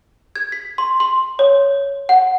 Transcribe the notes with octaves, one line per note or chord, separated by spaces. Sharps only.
G#6
B6
C6
C6
C#5
F#5